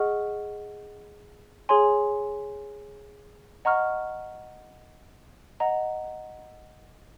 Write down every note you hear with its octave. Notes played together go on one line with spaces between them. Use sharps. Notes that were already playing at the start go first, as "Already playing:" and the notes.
Already playing: G#4 D#5 F#5 C#6 F6
G#4 C#5 G#5 C6
D#5 F#5 A#5 C#6 F6
D#5 F#5 A#5